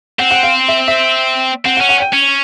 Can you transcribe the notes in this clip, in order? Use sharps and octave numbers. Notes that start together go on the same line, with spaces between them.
C4 F#5
F#5
F5
E5
E5
C4 F#5
F#5
C#4
F#5
G5
C#4